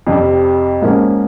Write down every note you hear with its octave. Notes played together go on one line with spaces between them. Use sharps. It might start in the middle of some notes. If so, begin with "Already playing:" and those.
F2 C3 G3
G#2 F3 A#3 C#4